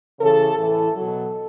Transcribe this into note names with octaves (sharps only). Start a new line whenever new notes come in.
C#3 E3 A4
A2 E3 A4
B2 F#3 A4